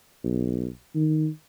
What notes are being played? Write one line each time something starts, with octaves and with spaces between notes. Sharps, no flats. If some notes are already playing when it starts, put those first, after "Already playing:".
B1
D#3